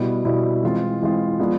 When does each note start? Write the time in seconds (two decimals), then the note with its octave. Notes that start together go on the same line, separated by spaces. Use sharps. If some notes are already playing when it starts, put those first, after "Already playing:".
Already playing: B2 G3 B3 E4
0.25 B2 G3 B3 E4
0.63 E3 G#3 C4 F4
1.02 E3 G#3 C4 F4
1.39 F3 G#3 B3 D4 F4